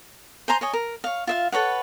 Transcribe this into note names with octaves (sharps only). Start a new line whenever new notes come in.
C5 G#5 A#5 C6
C#5 D#5 G#5
A#4
C#5 F5
F4 E5 F5
A4 B4 C#5 F#5